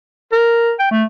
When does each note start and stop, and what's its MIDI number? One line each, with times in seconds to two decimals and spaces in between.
0.32 0.72 70
0.79 0.87 79
0.91 1.04 57